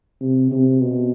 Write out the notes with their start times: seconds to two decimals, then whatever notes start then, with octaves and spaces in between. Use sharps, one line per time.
0.21 C3
0.51 C3
0.81 B2